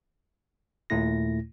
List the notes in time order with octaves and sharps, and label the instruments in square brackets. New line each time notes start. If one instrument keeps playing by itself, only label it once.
[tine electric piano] D#2 A#2 A3 E4 A#6